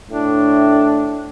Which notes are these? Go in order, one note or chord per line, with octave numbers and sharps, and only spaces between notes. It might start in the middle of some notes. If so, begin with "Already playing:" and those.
A2 D4